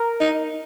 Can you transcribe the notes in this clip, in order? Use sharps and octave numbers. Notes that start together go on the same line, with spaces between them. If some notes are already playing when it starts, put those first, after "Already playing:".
Already playing: A#4
D#4